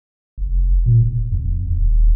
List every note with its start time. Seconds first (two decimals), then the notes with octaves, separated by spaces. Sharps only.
0.38 F1
0.86 A#2
1.01 E1
1.32 F2
1.66 D#1